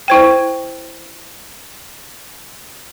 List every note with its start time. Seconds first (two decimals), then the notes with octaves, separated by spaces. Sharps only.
0.08 E4 C5 G5